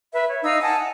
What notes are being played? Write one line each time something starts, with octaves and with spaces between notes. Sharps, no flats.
B4 E5
C#5
D#4 D#5 F5 E6
F#5 G#5 A5 D#6
F#5